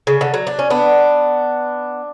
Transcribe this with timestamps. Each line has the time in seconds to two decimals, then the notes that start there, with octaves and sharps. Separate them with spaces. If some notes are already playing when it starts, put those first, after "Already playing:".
0.07 C#3
0.21 D3
0.34 F#3
0.47 D4
0.59 C#4
0.70 B3 D4